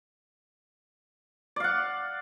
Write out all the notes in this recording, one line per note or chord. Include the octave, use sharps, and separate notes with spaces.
D5 F5 F#5